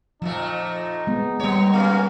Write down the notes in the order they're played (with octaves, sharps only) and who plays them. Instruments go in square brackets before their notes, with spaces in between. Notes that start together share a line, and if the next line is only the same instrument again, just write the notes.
[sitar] F2 A#2 A3 [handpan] F3 [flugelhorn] D#4
[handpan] G#3 B3
[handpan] G3 A#3 [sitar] B3 G4 C#5
[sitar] A3 B3 C#4 [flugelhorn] F5